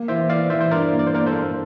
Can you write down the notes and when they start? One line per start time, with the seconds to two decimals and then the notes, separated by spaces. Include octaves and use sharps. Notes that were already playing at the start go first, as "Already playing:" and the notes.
Already playing: A#3
0.08 E3 C5 E5
0.29 E3 D5 F5
0.50 E3 C5 E5
0.61 C5
0.71 G2 A#4 D5
0.92 A#3
0.99 D5
1.07 C5
1.13 A#3 A#4 D5
1.26 A4 C5
1.34 A#3